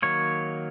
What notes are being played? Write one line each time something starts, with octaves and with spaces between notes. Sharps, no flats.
D#3 F#3 A#3 C#5